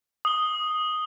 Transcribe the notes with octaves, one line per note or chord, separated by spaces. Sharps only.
D#6 G7